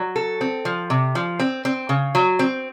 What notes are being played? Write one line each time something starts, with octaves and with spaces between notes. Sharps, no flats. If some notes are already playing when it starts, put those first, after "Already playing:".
Already playing: F#3
A4
C4
F3
C3
F3
C4
C4
C#3
F#3
C4